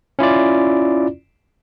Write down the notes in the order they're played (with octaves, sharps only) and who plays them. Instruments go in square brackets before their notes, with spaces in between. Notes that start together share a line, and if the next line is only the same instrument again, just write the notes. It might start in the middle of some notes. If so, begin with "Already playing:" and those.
[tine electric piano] C#4 E4 F4 D5